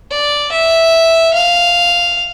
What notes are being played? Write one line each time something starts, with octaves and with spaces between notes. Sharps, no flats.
D5
E5
F5